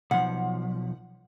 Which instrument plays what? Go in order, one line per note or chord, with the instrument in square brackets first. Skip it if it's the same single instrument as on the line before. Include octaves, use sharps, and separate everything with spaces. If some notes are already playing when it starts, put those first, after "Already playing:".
[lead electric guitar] B1 F3 [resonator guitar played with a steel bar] F#5